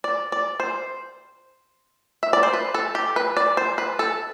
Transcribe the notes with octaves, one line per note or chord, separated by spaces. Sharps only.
D5
D5
C5
E5
D5
C5
B4
A4
G4
B4
D5
C5
B4
A4